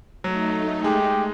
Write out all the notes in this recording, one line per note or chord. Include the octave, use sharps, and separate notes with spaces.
F#3 A3 D#4
G#3 G4